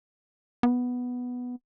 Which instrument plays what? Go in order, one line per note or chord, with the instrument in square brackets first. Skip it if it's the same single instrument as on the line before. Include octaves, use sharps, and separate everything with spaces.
[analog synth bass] B3